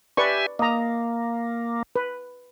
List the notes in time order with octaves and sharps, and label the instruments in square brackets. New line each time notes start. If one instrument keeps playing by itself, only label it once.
[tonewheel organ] G4 E5 G#5 [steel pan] B4 D5 C#6
[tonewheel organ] A#3 [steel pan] D#5 A#5
[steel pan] B4